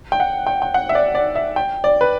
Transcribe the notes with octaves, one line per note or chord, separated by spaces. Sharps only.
G5
F#5
G5
G5
F#5
E5
D5
D5
E5
G5
D5
B4